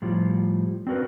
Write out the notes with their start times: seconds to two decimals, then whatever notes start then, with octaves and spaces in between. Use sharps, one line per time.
0.02 A2 F3 G3
0.87 C4 D4 F#4 A#4 B4